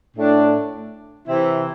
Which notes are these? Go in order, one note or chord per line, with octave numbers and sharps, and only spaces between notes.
A2 A3 D4
C3 E3 C4 E4